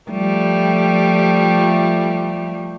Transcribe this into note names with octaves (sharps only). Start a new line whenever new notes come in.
F3 G3 A3